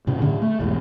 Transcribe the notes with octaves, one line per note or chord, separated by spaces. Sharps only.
G2 C3 C#4
D2 A2 D3
A3
B1 E2 G#2